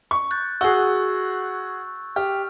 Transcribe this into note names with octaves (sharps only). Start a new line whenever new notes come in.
C#6
F#6 G6 A6
F#4 G#4 C#6 E6
G4 F6